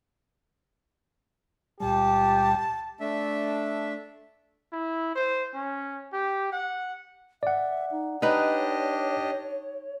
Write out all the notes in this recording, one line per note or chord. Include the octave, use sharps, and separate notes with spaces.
C#2 A#2 G3 G4 A5
A3 D4 E5
E4
C5
C#4
G4
F#5
D5 E5 F#5
D#4
D4 D#4 G4 B4 C#5 D#5